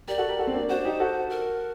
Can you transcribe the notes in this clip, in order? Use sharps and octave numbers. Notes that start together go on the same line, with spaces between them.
G4 A#4 D5
F#4 A4
G4 A#4
F#4 A4
C4
A#3 D4
D4 F#4 C5
D#4 G4
F#4 A4
A#4